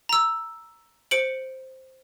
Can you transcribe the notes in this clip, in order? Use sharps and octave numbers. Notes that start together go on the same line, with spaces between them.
A#5 E6
C5 C#7 D7 F#7